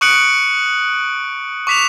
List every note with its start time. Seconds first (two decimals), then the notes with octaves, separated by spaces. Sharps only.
0.01 C#6 D#6 F#6 C#7 D7 F#7
1.67 C#6 D6 B6 E7 F7